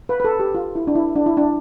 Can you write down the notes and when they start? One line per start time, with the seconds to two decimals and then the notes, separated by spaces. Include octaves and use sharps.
0.09 B4
0.20 B4
0.24 A4
0.40 G4
0.55 F4
0.75 E4
0.87 D4
0.95 E4
1.16 D4
1.26 E4
1.37 D4